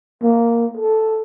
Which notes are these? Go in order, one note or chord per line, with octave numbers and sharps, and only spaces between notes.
A#3
A4